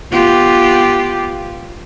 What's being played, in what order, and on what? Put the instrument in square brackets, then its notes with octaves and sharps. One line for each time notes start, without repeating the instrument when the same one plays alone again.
[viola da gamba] B3 F4 G4